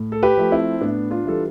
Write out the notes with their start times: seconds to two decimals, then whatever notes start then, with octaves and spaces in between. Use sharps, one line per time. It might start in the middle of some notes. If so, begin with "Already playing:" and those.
Already playing: A2
0.12 A4
0.23 G4 B4
0.37 F3 A3
0.51 C4 E4
0.81 A2 B3 D4
1.11 D4 F4
1.25 E3 G3 A4